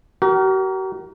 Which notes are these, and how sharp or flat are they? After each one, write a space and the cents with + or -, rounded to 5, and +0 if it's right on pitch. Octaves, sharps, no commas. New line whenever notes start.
F#4 +45 A#4 +5